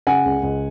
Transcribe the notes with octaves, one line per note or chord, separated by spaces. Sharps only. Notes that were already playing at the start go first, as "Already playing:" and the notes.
C#3 F#5 G#5
C#2
C#2